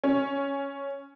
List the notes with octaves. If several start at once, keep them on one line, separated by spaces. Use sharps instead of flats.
C#4